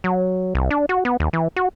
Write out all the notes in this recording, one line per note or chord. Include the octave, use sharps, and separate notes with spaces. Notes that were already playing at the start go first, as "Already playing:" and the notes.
F#3
C2
D4
F#4
B3
D#2
E3
F#4